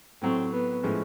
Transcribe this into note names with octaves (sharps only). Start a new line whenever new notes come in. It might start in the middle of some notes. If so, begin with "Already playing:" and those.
A2 F#3 A3 C4
B3
A2 F3 G#3 C#4